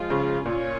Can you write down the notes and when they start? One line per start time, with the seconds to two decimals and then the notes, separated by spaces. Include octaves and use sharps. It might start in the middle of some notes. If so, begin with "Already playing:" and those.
Already playing: F3 G#3 F4
0.10 C#3
0.45 A#2 A#3 C#4 F4 C#5